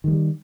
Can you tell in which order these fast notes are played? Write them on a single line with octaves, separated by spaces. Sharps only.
D#3 G#3 G3